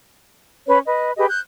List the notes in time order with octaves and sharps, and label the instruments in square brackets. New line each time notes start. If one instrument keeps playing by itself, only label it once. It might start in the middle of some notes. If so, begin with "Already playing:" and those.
[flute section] C#4 B4 C#5
B4 D#5
G4 G#4 B4 D#5
F#6 G6